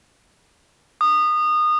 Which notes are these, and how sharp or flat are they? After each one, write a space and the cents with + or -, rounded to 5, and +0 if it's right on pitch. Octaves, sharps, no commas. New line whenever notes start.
D#6 -25